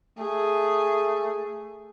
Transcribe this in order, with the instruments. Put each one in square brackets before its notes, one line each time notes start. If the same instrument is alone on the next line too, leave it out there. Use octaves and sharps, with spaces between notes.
[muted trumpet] A3 [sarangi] G#4